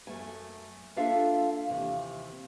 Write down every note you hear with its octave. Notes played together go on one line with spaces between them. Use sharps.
F#2 A3 G#5
A#3 D4 F4 A4 E5 F5
D#2 C3 E3